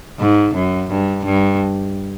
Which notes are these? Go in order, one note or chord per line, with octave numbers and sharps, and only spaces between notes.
G#2
F#2
G2
G2